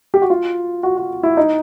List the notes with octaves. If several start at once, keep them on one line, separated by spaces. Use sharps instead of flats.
G4
F#4
F4
F#4
F#4
E4
D#4